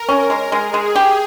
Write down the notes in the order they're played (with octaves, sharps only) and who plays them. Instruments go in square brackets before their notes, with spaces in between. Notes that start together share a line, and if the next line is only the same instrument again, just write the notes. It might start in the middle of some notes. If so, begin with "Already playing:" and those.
Already playing: [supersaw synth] A#4
[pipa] C#4
G#3
[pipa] G#3 [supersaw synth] G#4
[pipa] G#3
G4